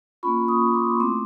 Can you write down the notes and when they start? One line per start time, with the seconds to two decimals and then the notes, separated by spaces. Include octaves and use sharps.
0.23 A#3 C#4 F4 B5 C#6
0.48 C#6 D#6
0.68 C#6
0.74 C6 D6
1.00 A3 C4 E4 C6 D6